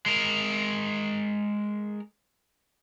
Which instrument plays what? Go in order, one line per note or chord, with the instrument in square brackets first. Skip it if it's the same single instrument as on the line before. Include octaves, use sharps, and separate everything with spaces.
[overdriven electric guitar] G#3 A#4